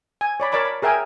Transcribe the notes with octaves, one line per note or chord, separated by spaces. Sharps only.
G#5
C#5 D5 B5
A#4 C#5 D5 A5 B5 D6
B5
G#4 A#4 E5 G5 G#5